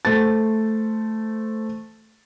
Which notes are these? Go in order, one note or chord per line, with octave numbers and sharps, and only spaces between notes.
A3 C5 A6